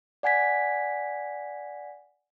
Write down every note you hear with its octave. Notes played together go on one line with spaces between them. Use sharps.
D5 F#5 G#5 G#6 B6